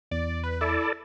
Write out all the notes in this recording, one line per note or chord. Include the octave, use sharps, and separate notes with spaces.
E2 D5
B4
E4 A4 D5